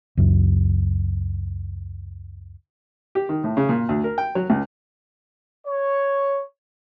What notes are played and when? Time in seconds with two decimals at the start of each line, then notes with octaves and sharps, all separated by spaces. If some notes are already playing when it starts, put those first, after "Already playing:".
0.17 C#2 F#2
3.15 G4
3.29 D#3
3.44 A2
3.57 C#3
3.69 A#2
3.89 D2
4.04 A#4
4.18 G5
4.35 F#3
4.50 C#2
5.67 C#5